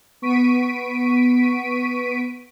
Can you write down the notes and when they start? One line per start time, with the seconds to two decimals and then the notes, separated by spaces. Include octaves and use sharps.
0.22 B3 C#6 B6 D7 D#7